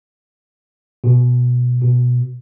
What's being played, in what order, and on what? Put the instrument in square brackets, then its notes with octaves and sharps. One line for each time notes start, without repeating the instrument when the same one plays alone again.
[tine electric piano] B2
B2